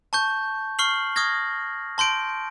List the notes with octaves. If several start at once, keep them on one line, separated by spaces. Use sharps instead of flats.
A5 C#6 G6
C#6 F6 C7 F#7
C#6 D#6 F6 G#6 A#6
A5 C6 G6 D7